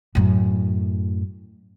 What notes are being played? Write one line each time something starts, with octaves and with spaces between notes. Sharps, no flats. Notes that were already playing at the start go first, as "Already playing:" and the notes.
F#2 A2